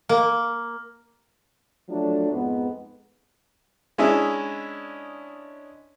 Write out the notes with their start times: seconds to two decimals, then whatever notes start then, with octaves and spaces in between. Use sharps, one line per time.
0.09 A#3
1.89 F3 F#3 A3 D4
2.31 F2 G#2 B3
3.98 G#3 C#4 D4 E4 D#5 E5